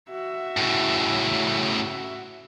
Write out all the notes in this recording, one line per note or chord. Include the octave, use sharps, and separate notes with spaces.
F#4 E5
A2 C#3